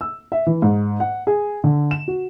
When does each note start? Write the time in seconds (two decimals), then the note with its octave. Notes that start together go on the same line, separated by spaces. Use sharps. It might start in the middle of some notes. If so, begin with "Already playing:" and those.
0.01 E6
0.32 E5
0.47 E3
0.62 G#2
1.00 F#5
1.27 G#4
1.64 D3
1.91 E7
2.08 F#4